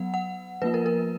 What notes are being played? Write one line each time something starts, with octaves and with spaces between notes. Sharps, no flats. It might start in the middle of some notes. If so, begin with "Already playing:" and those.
Already playing: F#3 B3 F#5
F#5
F3 A#3 F4 B4
A#4
A#4